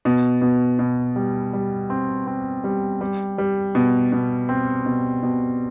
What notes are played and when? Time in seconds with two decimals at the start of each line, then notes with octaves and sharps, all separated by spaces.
0.05 B2
0.42 B2
0.79 B2
1.16 G3
1.53 G3
1.90 C4
2.27 C4
2.64 G3
3.01 G3
3.38 G3
3.75 B2
4.12 B2
4.49 C4
4.86 B2
5.23 B2